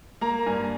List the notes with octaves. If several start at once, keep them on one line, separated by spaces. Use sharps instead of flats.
A#3 A#5
G2 G#5